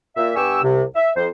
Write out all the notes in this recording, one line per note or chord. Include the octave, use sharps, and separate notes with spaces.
A#2 E5
G2 B3 G4 G#5 C#6 E6
C2 C3
E5
F2 C5